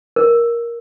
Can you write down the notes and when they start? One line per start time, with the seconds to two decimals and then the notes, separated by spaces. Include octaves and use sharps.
0.16 A#4